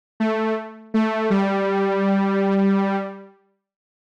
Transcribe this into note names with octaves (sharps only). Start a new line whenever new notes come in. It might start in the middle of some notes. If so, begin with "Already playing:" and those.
A3
A3
G3